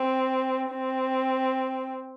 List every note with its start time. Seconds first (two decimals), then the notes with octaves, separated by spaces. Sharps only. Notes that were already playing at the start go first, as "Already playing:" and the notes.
Already playing: C4
0.71 C4